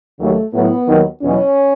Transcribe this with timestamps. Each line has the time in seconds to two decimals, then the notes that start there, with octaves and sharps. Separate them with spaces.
0.18 D#2 C#3 F#3 A3
0.53 A2 F#3 B3
0.87 D#2 D#3 F#3
1.21 E2 B2 F#3 C#4